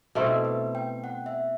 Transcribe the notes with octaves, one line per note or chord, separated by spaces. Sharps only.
B2 A3 C4 E4 A4
B4
G5
F#5
E5